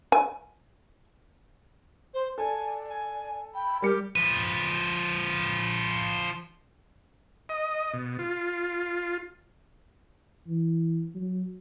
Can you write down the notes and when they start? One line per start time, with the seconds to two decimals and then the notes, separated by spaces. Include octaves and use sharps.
0.12 G#5
2.14 C5
2.38 A4 D5 G#5
2.89 G#5
3.55 G5 B5
3.82 G3 G4 A#4 C#7
4.16 F3 B4
7.49 D#5
7.93 B2
8.19 F4
10.47 E3
11.15 F#3